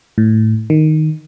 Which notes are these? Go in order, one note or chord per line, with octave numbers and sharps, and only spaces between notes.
A2
D#3